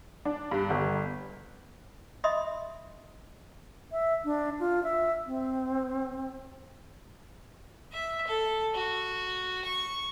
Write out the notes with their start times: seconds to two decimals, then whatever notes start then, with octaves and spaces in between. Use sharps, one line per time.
0.25 D4
0.51 G2
0.70 G1
2.24 D#5 E5 B5 C6 D#6
3.91 E5
4.25 D4
4.60 F4
4.84 E5
5.26 C4
7.92 E5
8.27 A4
8.74 F#4
9.65 C#6